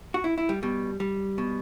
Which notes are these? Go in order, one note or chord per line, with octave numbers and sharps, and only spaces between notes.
F#4
E4
E4
G3
B2 G3
G3
B2